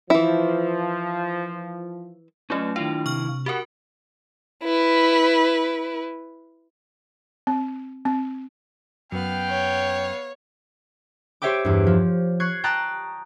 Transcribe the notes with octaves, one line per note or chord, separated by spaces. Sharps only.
E3 F3 E4
F#3 A3 C#4 F4 D#5 G#5
D#3 D4 E4 F4 F5
C3 C#6 F6
F#4 G4 A#4 F5 F#5
E4 B4
C4
C4
F#2 B3 F5 G5
C#5
G4 C5 C#5 E5 G5 D6
E2 G2
F3
C#6 F#6 G#6 C7
G5 A5 A#5 D#6 F#6 A6